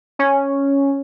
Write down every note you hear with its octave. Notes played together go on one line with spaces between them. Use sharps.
C#4